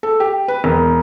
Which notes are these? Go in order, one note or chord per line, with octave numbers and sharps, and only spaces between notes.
A4
G4
B4
E1